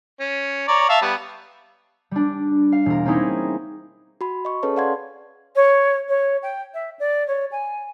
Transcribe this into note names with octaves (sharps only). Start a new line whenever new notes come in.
C#4
C#5 D5 A#5
E5 F5 A5
G3 B3
G3 D4
F5
E1 A#4
A#3 C4 C#4 D#4 E4 G#4
F#4 B5
D#5 C#6
C#4 G#4 A4 B4 C#5 A5
D5 F5 F#5 C6 G#6
C#5
C#5
G5
E5
D5
C#5
G#5